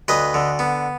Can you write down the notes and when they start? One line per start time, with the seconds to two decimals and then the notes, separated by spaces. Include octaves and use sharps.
0.08 D2 B4 D#5
0.34 D3
0.59 B3